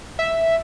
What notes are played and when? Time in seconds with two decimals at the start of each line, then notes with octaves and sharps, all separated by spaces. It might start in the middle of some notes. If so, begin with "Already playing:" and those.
0.19 E5